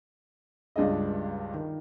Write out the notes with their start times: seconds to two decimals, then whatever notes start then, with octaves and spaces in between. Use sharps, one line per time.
0.76 C#2 G2 D4 G#4 D#5
1.54 D#3